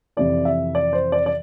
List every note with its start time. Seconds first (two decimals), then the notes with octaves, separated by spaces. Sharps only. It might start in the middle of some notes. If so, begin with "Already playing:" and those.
0.17 F2 C3 E3 D5
0.45 E5
0.75 D5
0.93 C5
1.12 D5
1.26 D5